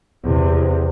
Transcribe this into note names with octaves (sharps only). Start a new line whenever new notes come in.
E2 C3